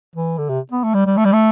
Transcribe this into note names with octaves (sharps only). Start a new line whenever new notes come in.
E3
D3
C3
B3
A3
G3
G3
A3
G3
A3